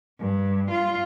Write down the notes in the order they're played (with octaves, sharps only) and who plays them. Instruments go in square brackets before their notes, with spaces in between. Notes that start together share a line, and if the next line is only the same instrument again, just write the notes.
[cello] G2
F4